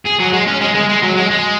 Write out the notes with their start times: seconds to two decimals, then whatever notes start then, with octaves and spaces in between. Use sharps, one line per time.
0.05 G#4
0.19 F#3
0.33 G#3
0.48 C#4
0.61 G#3
0.75 G#3
0.89 G#3
1.03 F#3
1.17 G#3
1.31 G#3